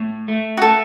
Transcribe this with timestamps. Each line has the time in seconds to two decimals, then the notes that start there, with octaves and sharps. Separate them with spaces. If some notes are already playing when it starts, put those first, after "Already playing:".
Already playing: A2
0.28 A3
0.57 F#4
0.62 A3 A4